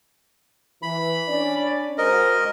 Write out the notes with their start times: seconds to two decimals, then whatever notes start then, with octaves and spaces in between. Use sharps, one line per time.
0.83 E3 B5
1.29 C#4 D4 D5
1.98 G#3 F#4 A#4 C5 D#5